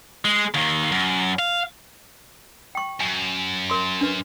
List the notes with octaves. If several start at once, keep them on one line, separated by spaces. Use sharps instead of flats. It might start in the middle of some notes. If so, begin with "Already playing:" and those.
G#3
D#2 D#3
F#2
F5
G5 C#6
F#2 G#5
A#4 C6
D4 B4